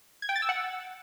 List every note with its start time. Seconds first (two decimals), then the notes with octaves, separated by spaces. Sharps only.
0.22 G#6
0.29 G5
0.36 A6
0.42 E6
0.49 F#5